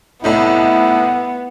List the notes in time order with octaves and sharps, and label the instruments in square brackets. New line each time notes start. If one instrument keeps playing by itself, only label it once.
[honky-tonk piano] C2 A2 D#4 [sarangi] B3 [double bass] E4